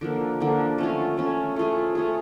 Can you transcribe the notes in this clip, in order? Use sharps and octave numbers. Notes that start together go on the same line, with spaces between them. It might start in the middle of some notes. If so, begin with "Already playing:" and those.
D3 F3 A#3
D3 F3 A#3
A3 C#4 F4
A3 C#4 F4
A3 C#4 F4 G#4
A3 C#4 F4 G#4